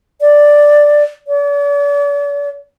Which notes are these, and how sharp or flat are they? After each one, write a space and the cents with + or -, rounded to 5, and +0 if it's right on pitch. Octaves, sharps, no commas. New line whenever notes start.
D5 +0
D5 -45